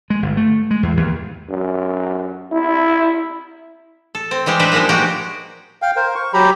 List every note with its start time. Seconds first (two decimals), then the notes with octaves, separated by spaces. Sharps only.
0.10 G#3
0.22 G1
0.37 A3
0.71 G#3
0.83 E2
0.97 D#2
1.50 F#2
2.52 E4
4.15 A4
4.31 C4
4.46 E3 G3 G#3 G4
4.60 D4 D#4 B4 C5 D5 E5
4.72 F3 G3 G#3 A#3 D#4
4.89 G#3 A#3 D4 D#4 F#4 G4
5.82 F5 G5
5.96 A#4 C5
6.15 C#6
6.33 F#3 G4 A#5 B5